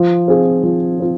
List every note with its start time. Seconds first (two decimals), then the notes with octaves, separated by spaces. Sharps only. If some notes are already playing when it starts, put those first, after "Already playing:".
Already playing: F3
0.28 C4 F4 G#4
0.63 F3
1.00 C4 F4